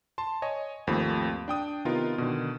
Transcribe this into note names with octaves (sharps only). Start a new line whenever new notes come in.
A5 C6
C#5 D#5 G#5
G#1 D#2 F3 A3 C4 B5
D4 G5 D#6
C3 D#3 B3 D#4 F4 A#4
B2 D3 D#3